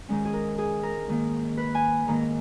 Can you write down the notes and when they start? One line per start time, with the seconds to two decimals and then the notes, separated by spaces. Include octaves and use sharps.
0.08 G#2 D#3 G#3 C#4
0.25 G#4
0.33 A#4
0.58 G#4
0.83 A#4
1.08 G#2 D#3 A#3
1.57 B4
1.75 G#5
2.08 G#2 D#3 A#3 D#4 A#5